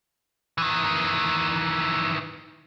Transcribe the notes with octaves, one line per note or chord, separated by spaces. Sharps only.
D#3 E3